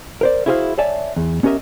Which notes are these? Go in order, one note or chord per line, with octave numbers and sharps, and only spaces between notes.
A#4 C5 D5
E4 F#4 G#4 C5 D#5 F5
C#5 D5 E5 G#5 A5
E2
B3 C#4 G4 A#4 D#5 E5